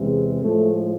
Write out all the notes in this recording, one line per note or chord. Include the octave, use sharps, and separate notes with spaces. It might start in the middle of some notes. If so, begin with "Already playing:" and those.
Already playing: E2 C3 G#3
A2 F3 G#3 A3